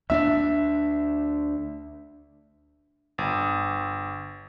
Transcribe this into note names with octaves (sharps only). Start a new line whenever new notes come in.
D2 C#4 D4 E5
G1